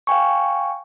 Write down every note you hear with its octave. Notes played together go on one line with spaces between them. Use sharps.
F5 G5 G#5 C#6